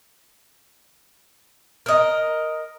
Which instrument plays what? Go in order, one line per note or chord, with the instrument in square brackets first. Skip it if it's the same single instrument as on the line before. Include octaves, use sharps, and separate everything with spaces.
[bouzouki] A#4 D#5